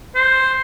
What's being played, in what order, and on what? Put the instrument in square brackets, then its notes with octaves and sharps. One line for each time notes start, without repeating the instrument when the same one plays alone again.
[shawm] C5